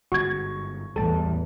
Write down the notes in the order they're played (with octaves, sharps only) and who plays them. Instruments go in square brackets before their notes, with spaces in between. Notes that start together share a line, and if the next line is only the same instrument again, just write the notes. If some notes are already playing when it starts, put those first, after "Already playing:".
[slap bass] G1 G#2 [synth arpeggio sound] F#4 [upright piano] C#6 G#6
[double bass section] A1 E2 [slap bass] G3 [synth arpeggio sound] A4 A5